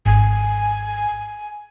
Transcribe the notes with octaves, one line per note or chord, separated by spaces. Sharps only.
G#1 G#5